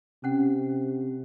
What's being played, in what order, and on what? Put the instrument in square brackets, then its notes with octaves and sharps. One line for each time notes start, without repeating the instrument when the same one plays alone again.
[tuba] C3 [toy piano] C#4 F#5